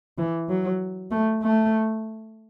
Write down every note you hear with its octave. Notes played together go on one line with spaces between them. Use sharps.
E3
F#3
A3
A3